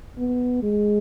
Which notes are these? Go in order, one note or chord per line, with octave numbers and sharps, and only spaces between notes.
B3
G#3